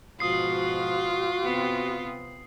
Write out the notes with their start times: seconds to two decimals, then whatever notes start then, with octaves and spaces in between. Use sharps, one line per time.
0.20 G#2 B2 F3 F4 F#4 D#6 C7
1.42 C3 B3 C4